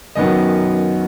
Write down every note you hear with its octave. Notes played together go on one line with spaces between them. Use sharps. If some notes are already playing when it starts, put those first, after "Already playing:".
F#2 D#3 F#3 B3 D#5